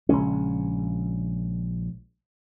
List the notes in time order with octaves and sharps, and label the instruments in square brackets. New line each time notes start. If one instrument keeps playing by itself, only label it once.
[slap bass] A#1 C#3 G#3 C#4